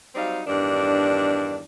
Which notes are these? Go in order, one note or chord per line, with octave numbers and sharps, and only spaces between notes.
F#3 G3 C4 D#4 F5
E2 G2 D#3 D4